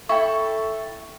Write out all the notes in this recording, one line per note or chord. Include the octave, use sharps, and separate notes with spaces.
E4 A4 G5 C#6